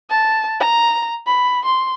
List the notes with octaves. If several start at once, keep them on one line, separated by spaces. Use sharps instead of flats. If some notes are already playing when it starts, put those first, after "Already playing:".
A5
A#5
B5
C6